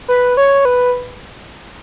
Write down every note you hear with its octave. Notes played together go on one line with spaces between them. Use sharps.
B4
C#5
B4